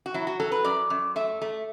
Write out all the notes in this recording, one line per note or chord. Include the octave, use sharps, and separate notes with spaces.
F#4
F#3 E4
F#4
F#3 A4
B4
F#2 D5
F#2
A3 E5
A3